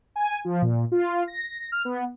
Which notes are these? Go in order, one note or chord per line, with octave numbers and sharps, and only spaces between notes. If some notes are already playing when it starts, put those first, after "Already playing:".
G#5
F3
A#2
F4
A#6
F6
B3